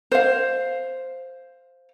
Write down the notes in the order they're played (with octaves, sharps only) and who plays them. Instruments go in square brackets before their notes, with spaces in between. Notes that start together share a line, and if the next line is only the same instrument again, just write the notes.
[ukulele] C5 F5